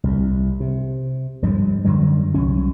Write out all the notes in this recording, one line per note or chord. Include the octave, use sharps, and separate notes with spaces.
C2
C3
G2 F3 G#3
F#2 D3 F#3 G3
C2 F#3 C#4